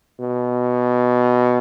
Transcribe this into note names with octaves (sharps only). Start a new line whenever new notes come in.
B2